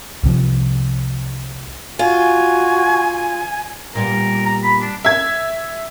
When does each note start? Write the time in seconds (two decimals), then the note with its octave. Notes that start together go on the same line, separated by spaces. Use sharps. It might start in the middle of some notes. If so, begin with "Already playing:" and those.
0.23 C2 C3 F3
1.99 F4 F#4 G#5
3.95 A#2 G3 B3 A#4
4.46 A#5
4.64 B5
4.82 D4
5.05 E5 G#6